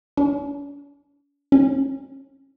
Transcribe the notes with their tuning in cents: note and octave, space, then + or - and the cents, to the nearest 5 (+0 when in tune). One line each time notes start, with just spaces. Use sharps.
C#4 +45
C#4 -30